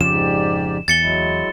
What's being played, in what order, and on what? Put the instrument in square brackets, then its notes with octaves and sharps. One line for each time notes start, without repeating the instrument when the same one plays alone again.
[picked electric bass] F2 C#3 F3 [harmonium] G#2 G4 D5 [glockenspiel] E7
[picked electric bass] E2 [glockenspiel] A6 C#7 G7
[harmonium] F#3 G#3 E4